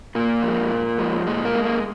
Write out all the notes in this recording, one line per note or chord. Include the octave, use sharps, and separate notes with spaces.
A#2 A#3
F3 G#3
A#2
F3 G#3
A#2 G#3
A#3
G#3
A#3